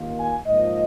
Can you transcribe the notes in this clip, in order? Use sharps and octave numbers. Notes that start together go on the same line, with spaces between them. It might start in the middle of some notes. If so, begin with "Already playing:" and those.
Already playing: D#2 D#3 A#3 F4
G#5
G#2 F3 A#3 F4 D#5